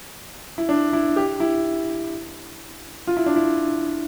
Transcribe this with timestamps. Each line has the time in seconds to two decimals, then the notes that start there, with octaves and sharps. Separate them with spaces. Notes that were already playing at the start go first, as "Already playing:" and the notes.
0.58 E4
0.69 D4
0.93 E4
1.16 G4
1.40 E4
3.07 F4
3.17 E4
3.26 D4
3.36 E4